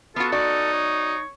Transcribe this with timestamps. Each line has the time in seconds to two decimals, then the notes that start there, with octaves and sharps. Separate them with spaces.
0.16 B3 F4 F#4 A4
0.32 D#4 F#4 D5
0.73 C#5